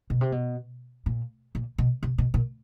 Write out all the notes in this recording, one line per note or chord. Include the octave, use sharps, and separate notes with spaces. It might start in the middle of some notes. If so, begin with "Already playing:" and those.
B2
C3
B2
A#2
A#2
B2
C3
B2
A#2